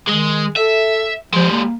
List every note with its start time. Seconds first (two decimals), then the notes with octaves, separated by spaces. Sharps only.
0.07 D#3 G#3
0.56 A4 E5
1.34 F3 G#3 G4
1.51 A#3